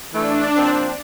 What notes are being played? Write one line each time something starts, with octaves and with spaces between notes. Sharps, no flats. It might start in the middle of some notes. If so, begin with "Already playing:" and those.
E3 A3 D4
F3 A#3 C4